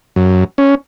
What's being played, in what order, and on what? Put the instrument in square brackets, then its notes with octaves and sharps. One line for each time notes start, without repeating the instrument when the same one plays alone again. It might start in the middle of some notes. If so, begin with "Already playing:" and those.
[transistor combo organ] F#2
C#4